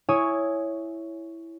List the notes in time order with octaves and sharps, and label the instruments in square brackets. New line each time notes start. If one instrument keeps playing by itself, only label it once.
[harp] E4 C#5 G#5 D#6